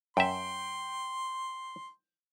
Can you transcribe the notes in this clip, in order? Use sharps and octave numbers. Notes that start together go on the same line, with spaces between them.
F#2 E5 G5 C6